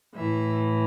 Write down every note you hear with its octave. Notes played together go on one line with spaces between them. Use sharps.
A2 E3 E5